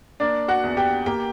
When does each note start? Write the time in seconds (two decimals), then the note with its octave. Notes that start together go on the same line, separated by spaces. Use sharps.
0.20 A#3 D4 D5
0.48 F#4 F#5
0.64 E2
0.77 G4 G5
1.06 A#3 G4 G5